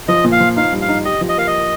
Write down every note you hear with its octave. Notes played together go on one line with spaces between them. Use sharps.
F3 D#5
A#2
F5
F3
D#4 F5
G2
F5
D#4
G4 D#5
F3
D#5
A#3 F5
D#5